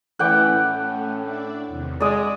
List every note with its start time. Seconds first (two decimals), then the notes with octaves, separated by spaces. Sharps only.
0.19 E3 A3 C#4 F#5 G5 D6
0.54 A2
1.22 D4 D5 E5
1.68 E2 C3 D#3
2.00 G#3 D5 E5 F#5 D6 D#6